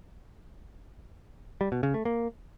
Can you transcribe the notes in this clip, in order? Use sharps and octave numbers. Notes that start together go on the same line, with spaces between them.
G3
B2
C#3
A3
A#3